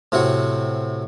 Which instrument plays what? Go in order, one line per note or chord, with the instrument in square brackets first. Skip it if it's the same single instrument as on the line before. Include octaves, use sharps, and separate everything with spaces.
[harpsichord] A2 C3 C4 F#4 F#5